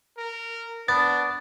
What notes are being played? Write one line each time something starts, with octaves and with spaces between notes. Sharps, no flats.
A#4
B3 D4 A6